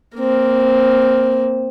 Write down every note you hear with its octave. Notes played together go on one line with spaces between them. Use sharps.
A#3 C4